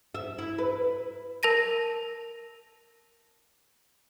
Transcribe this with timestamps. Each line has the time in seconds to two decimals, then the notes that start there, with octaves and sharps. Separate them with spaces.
0.15 E5
0.38 E4
0.58 B4
1.43 A#4 A5 A#6 D#7